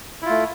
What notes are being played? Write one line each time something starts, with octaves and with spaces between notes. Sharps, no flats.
A3 E4 F4